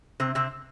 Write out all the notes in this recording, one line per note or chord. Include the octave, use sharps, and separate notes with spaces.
C3 C4
C3 C4